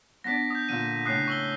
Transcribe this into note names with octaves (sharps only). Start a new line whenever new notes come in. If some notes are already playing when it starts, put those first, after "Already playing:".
B3 D4 D5 A#6 B6
D#6 G6
A#2 D3 D#7
A2 C#3 D4 D#6 F#6 C7
C#6 E6 G7